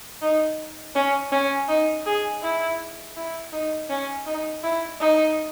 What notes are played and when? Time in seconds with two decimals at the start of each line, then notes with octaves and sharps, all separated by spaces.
0.22 D#4
0.95 C#4
1.32 C#4
1.68 D#4
2.06 G#4
2.42 E4
3.16 E4
3.52 D#4
3.89 C#4
4.26 D#4
4.63 E4
5.00 D#4